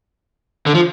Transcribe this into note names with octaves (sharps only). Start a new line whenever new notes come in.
D3
F3